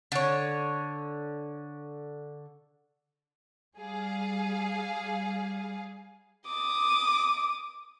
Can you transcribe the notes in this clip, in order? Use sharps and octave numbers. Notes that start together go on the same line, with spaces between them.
D3 C#5
G3 G#4 F5
D6 D#6